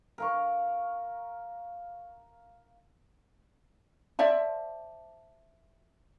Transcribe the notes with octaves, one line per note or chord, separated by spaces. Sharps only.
A#4 F5 C#6
C5 D5 E5 A5